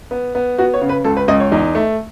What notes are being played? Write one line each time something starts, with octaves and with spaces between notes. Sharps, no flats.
B3
B3
B3 F#4
C#5
C#3
B4
C#2 A4
B4
C#2 D#5
C#5
E2 D#4
A3